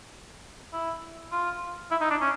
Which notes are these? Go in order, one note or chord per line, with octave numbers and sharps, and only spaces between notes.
E4
F4
E4
D#4
D4
C#4